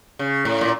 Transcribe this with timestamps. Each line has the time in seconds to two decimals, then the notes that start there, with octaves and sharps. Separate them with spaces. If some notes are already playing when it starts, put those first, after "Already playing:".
0.19 C#3
0.45 A2
0.61 A#2